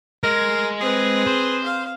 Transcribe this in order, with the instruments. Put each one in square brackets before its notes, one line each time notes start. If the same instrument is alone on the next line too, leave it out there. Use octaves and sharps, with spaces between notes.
[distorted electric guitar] G#3 [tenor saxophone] A#4
[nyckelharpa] C4 B4 [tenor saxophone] G#4
[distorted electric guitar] C5
[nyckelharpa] F5